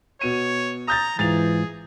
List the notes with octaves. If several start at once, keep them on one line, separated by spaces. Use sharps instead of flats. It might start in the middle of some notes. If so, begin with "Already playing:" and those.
B2 C#5 D#7
A#5 D#6 G6 A6
G#2 E3 F4 G#4 A6 F7